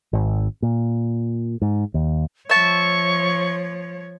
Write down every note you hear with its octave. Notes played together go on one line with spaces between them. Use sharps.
G#1
A#2
G#2
D#2
F3 C#5 E5 A5 C#6